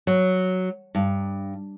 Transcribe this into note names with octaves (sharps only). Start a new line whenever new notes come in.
F#3
G2